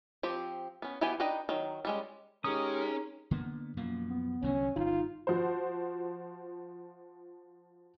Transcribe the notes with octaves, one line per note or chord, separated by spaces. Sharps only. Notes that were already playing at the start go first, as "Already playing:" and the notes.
F3 C4 G4
B3 C#4
E3 B3 F#4 G4 G#5
D4 D#4 B4 D#5 G5
D#3 F#3
G3 G#3 C#4
G#3 C#4 D#4 G4 G#4 A#4 A#5 D#6
D3 A#3 B3
F#2 B2 F3 A#3
B3
C2 D3 F#3 C#4
G1 D#4 F4
F3 F#4 C5